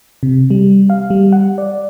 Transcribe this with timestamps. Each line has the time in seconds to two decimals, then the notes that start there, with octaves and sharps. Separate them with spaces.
0.23 C3
0.50 G3
0.90 F5
1.10 G3
1.33 F#5
1.58 D5